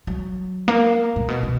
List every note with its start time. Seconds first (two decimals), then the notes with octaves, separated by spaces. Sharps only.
0.07 F#3
0.68 A#3
1.16 A#2
1.28 B2
1.43 B2